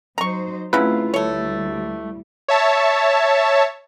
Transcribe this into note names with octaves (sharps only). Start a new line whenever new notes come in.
F#3 D#4 C5 A#5 C#6
C#3 F#3 A3 C4 E4 F4 B4
D2 G3 A3 C#5
C#5 E5 A5